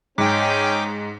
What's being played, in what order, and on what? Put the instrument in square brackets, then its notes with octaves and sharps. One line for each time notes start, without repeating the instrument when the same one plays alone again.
[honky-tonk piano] G#2 [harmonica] C#4 D#4 [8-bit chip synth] G5 D6